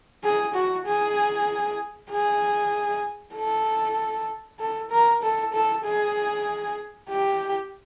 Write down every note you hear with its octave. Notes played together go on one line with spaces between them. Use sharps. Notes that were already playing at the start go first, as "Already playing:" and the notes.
G#4
F#4
G#4
G#4
A4
A4
A#4
A4
A4
G#4
G4